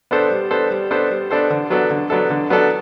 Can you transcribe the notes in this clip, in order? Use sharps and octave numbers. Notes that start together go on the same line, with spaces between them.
B3 D4 A4 C5
G3
B3 D4 A4 C5
G3
B3 D4 A4 C5
G3
B3 D4 A4 C5
D3
F#3 B3 D4 A4
D3
F#3 B3 D4 A4
D3
F#3 B3 D4 A4